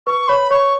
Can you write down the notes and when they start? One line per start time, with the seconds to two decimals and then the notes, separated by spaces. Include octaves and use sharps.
0.07 B4 C#6
0.28 C#5 B5
0.51 C#5 C#6